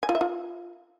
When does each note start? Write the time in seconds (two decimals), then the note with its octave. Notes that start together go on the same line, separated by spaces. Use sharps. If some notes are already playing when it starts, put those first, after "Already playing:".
0.03 G#5
0.09 F4
0.15 E5
0.21 F4